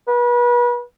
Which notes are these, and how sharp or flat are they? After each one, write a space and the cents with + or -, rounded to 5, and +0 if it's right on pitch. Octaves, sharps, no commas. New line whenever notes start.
B4 -35